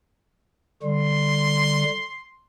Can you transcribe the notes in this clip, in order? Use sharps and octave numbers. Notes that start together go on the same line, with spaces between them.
D3 G3 C6